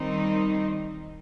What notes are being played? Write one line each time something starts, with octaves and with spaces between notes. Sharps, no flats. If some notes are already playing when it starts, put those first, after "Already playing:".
Already playing: D#3 G3 C4 D#4